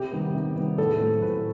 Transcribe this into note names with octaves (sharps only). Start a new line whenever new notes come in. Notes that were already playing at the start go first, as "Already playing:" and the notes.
Already playing: C3 G4
D#3 G3 B3
C3
D#3 G3 B3
A2 A4
F#3 A3 C4
A2 B4